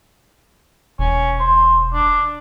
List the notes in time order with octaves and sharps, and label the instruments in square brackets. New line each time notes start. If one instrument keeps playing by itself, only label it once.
[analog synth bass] E1 [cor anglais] C#4
[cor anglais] C5
D4